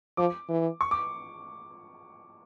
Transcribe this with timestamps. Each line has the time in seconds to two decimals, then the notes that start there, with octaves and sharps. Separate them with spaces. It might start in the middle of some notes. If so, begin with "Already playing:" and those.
0.17 F3 D6
0.49 E3
0.81 C#6
0.91 D6